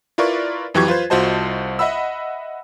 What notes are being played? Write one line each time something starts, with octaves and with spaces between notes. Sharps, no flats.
E4 F4 A#4 B4 D5 C#6
F2 E3 F#3 G4 C#6 G#6
F4 B4 C5
C2 F4 F#4 C5 D#5 A5
D#5 E5 F#5 B5 E6